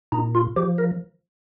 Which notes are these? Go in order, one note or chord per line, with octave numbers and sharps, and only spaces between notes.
A#2 D#4
F4
F3 G4
A#4